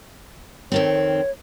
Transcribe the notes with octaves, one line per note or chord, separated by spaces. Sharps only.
F2 D#3 C4 C#5